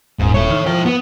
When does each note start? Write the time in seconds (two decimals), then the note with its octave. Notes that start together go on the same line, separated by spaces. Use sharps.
0.19 D#1 G#2
0.34 A4 C#5
0.50 D#3
0.66 F3 E4 G5
0.86 B3